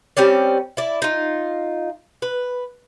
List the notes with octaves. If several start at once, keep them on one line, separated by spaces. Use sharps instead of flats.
G3 C4 C#4 D5
E4 D5
D#4 F4
B4